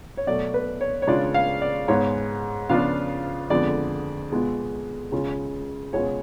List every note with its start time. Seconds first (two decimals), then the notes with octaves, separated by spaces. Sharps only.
0.17 C#5
0.27 B2 F#3 A3 D5
0.54 B4
0.81 C#5
1.02 C#5
1.07 C#3 G#3 D4 F4 D5
1.34 F5
1.62 D5
1.88 G#2 G#3 B3 C#5
2.69 C#3 F3 B3 D4 F4 F5
3.50 F2 D3 F3 G#3 B3 D5
4.31 B2 G#3 B3 F4
5.12 C#2 C#3 G#3 C#4 F4
5.93 C#2 B2 G#3 C#4 F4 C#5